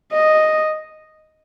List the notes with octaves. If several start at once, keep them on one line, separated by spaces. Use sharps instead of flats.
D#5